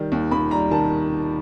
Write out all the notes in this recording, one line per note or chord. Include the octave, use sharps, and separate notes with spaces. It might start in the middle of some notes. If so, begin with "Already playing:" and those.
Already playing: D#3 G3
D#2
D#2 B5
G3 A#5
D#3 A5